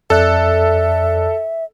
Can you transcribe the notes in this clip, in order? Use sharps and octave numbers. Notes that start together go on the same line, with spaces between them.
F2 A4 D5 E5 F#6